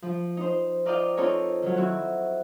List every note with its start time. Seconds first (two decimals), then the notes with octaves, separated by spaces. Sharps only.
0.02 F3
0.37 D#4 C5
0.85 F4 A#4 D5 D#5 F5 G5
1.17 C4 D#4 F4 A4 A#4 C#5
1.62 D#3 F#3
1.77 C4 E4 F#4